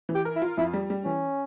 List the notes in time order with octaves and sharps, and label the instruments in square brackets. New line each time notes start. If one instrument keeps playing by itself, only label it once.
[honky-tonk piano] E3
[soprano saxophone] G4
[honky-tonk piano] A#4
[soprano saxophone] E4
[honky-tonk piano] F4
[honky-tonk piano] F2 [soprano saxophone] E4
[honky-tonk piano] G3
G3
[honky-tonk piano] E3 [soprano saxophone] C#4